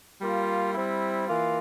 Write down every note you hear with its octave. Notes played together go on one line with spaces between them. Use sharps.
G3 A#3 F4
G3 C4 E4
E3 A#3 F4